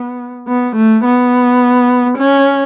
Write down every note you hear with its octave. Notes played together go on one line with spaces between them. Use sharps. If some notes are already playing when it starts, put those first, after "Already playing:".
Already playing: B3
B3
A3
B3
C#4